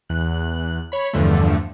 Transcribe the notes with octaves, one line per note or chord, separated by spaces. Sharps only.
E2 F#6
C#5 B5
E2 G2 D3 F3 A3